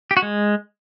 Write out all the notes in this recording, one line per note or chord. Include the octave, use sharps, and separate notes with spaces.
G4
F#4
G#3